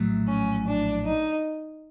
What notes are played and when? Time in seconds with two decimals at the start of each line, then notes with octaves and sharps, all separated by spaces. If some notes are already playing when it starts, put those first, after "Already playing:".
Already playing: A#1 A2 F#3 A3
0.27 C#4
0.66 D4
1.05 D#4